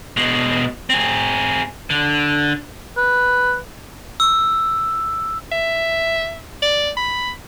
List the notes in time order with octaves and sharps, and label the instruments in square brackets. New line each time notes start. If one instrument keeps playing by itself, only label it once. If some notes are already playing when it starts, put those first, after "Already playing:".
[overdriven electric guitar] B2 G#3
C4 G#4
D3
[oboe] B4
[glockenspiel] E6
[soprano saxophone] E5
D5
B5